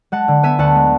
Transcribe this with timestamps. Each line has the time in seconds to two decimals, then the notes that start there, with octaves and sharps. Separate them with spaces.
0.12 G#3 F#5 A5
0.28 D3
0.43 B3 E5 G#5
0.59 D2 F#5 A5
0.76 G#3